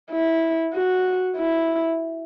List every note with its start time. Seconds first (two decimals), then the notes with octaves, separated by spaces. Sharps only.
0.11 E4
0.74 F#4
1.37 E4